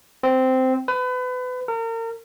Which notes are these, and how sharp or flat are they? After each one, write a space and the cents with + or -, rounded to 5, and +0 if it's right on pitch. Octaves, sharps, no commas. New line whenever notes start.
C4 -10
B4 +30
A#4 -35